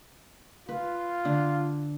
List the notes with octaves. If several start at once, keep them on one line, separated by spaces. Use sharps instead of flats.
F4 B4
D3 D4